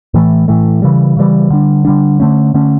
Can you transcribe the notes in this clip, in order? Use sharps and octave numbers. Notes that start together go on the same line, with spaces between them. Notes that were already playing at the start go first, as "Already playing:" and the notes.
A2 E3 A3
A2 E3 A3
C#3 E3 G3
C#3 E3 G3
D3 G3 D4
D3 G3 D4
D3 A3 C#4
D3 A3 C#4